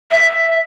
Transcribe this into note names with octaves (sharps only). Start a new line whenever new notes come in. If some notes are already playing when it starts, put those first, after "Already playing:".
E5